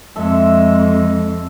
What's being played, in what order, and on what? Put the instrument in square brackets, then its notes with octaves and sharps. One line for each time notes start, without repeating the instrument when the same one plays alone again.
[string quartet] F2 [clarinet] G#3 [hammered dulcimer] A4 E5